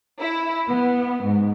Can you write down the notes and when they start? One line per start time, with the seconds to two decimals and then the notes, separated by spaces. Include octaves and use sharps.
0.20 E4
0.69 B3
1.23 G#2